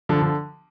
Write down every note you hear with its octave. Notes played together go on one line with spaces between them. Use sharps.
D3 F3
D3